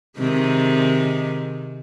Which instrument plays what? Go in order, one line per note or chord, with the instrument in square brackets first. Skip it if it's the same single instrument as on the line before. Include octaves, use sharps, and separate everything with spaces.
[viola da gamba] C3 D#3 G#3